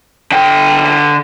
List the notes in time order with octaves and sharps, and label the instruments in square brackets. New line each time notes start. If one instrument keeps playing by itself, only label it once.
[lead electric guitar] D3 G5